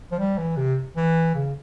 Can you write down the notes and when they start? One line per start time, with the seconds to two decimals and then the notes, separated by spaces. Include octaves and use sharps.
0.12 F3
0.19 G3
0.38 E3
0.57 C3
0.96 E3
1.35 C#3